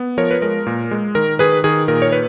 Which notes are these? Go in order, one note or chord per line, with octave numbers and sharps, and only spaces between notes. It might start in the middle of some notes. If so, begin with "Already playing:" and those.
Already playing: B3
F3 A#4 C#5
B4
G#3 A#4
A#2
G#3
D#3 A#4
D#3 G#4 B4
D#3 G#4
A#2 A#4
C#5
B4